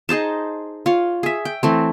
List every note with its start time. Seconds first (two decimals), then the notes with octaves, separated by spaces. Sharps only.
0.09 D#4 G#4 C5 A5
0.86 F4 C#5
1.23 G#4 E5
1.45 G5
1.63 E3 A3 C4